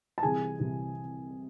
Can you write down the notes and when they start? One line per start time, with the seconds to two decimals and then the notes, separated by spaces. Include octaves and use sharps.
0.18 A5
0.23 C2 C3 E3 G#4 G#5
0.60 C2 C3 E3